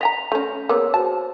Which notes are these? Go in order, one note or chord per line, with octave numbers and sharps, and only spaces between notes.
D#5 G5 A#5 A#6 B6 F7
A3 C#4 G6
A#3 B3 G#4 C#5 E6
F#4 C5 A5